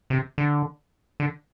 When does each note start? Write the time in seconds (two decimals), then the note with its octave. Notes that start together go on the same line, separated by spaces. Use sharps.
0.10 C3
0.38 D3
1.20 D3